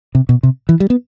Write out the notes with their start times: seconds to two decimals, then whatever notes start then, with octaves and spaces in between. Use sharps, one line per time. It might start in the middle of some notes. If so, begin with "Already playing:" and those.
0.15 C3
0.29 B2
0.43 C3
0.69 E3
0.80 G3
0.90 B3